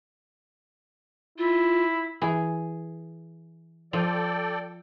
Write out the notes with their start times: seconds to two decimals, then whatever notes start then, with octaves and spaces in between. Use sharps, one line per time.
1.38 E4 F4
2.22 E3 G#4
3.93 F3 A4 D5 G5